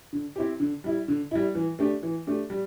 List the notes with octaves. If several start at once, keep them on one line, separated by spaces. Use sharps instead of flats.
D3
C4 E4 G4
D3
G3 E4
D3
G3 E4
E3
A3 D4 G4
E3
A3 D4 G4
G3